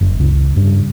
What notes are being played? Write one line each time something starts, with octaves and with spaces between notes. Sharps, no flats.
F#1
C#2
G2